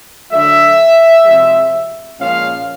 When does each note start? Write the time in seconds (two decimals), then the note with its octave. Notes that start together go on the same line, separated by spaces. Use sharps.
0.31 D3 F#3 A3 E5
1.25 C3 F3 G#3
2.19 A#2 F3 G#3 C#4 F5